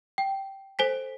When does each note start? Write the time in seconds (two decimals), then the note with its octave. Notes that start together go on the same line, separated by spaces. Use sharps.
0.18 G5
0.79 A4 C5 G#5 B6